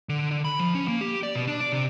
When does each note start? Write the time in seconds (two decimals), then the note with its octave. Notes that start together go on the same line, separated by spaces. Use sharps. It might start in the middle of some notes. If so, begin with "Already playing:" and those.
0.09 D3
0.31 D3
0.45 B5
0.60 F3
0.75 C#4
0.88 A#3
1.01 G4
1.23 D5
1.35 B2
1.47 D4
1.61 D5
1.72 C3